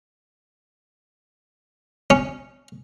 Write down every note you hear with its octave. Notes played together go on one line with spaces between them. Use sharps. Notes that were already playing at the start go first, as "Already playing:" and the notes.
C#4